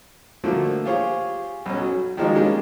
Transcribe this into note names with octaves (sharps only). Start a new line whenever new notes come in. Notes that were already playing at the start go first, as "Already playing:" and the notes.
D3 F3 F#3 A3 A#3
F4 G4 G#4 C5 C#5
B1 C#4
F#3
D#3 F3 F#3 G#3 A#3 D#4
G3 G#3 A#3 C#4 D4